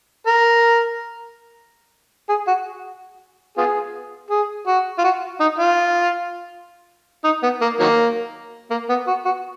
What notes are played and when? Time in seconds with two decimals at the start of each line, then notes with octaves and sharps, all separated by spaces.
0.27 A#4
2.29 G#4
2.47 F#4
3.57 B3 F4 G#4
4.30 G#4
4.67 F#4
4.98 F4
5.04 F#4
5.40 D#4
5.59 F4
7.24 D#4
7.43 B3
7.61 A#3
7.80 D#3 F#3 A#3
8.70 A#3
8.89 B3
9.07 F#4
9.25 F#4